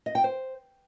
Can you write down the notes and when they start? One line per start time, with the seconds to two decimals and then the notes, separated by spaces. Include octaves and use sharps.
0.06 D#5
0.15 G5
0.24 C5